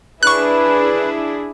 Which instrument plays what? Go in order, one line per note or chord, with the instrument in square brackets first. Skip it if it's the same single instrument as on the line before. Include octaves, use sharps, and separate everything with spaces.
[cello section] D4 E4 G#4 [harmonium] B4 [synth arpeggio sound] C#6 F#6